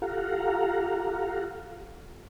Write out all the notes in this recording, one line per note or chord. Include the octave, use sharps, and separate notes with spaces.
F4 G4 A4 F5 F#5 A#5